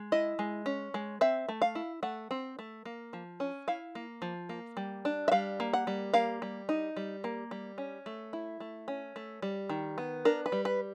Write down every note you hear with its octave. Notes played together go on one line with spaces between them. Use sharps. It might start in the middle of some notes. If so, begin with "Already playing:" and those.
Already playing: G#3
E4 D#5
G#3
C#4
G#3
C4 E5
A3
F5
E4
A3 F#5
C4
A3
A#3
F3
C#4
E4 F5
A#3
F3
A#3
G3
D4
E5
G3 F5
A#3
F#5
G3
A#3 F5
G3
D#4
G3
A#3
G3
C#4
A3
E4
A3
C#4
A3
G3
D#3
B3
D4 A#4
B4
G3
B4